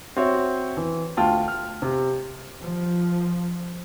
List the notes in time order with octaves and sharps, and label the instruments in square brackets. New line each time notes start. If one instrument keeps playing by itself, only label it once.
[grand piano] C4 F#4 C#5 E5 G5
E3
D2 F4 G5 A5
F6
C3
[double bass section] F3